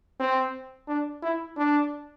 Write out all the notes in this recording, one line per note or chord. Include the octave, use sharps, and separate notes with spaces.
C4
D4
E4
D4